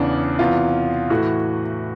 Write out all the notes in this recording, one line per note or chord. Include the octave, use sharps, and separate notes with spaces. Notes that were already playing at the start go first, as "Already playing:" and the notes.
Already playing: E2 C#3 E3 D4
E2 C3 E3 F4
A2 E3 F#4